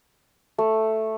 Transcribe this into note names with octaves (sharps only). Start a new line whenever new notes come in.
A3